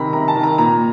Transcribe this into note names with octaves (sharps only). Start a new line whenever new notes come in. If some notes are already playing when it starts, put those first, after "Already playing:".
Already playing: C3 D#3 A#5 B5
C3 A#5
A5
D#3
A#5
A#2 A#5